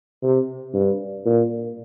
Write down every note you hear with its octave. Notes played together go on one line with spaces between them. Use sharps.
C3
G2
A#2